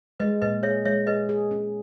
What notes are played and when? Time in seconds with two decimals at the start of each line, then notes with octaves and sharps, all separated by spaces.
0.20 G#3 B4 D#5
0.42 A#2 B4 D#5
0.63 G#4 C#5 E5
0.85 G#3 C#5 E5
1.07 G#4 B4 D#5
1.29 G#4
1.51 C#4